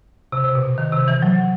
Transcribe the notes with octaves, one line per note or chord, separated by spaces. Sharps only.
C3
C3
B2
D#3
C3
E3
F#3